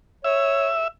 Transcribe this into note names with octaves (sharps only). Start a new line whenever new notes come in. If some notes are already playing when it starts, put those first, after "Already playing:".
C#5 E5